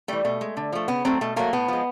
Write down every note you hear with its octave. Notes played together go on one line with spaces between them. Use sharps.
E3 G3 A3
B2 A3
G#3
D3
F3 A3
C#3 B3
F#3 A3 C4
B2 A3
F#3 A3 A#3
A2 B3
F3 G#3